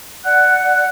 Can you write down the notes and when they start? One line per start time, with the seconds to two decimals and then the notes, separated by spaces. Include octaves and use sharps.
0.24 D5 F#5 F#6